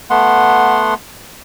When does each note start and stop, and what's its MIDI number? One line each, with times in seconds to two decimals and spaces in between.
0.10 0.94 57
0.10 0.94 59
0.10 0.94 78
0.10 0.94 84